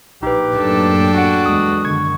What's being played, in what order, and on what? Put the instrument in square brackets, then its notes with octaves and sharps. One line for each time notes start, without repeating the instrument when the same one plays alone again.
[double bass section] A#1 [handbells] D#4 B4 [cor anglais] G4
[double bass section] F#2 A2 A#3 [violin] D4 A4
[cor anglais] F#4 [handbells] F#5 G5
[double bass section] E2 G#3 [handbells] D#6
[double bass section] F#2 D3 D#3 [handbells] C#6 G#6